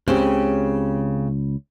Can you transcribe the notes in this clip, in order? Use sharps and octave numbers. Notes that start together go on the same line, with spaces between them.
C#2 C#3 C4 G4